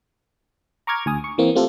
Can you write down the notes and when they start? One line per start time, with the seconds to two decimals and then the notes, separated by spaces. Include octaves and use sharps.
0.87 A#5 C#6 D6 F6 G#6
1.06 D2 G#5 D#6
1.24 C#6
1.38 E3 A#3 C4
1.55 A3 C4 F4 G4 A4